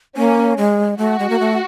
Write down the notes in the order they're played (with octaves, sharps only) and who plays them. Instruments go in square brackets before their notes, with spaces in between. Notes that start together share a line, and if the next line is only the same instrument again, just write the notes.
[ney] A#3 [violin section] C#4
[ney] G#3
[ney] A3 [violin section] F#4
[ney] G#3
A#3
A3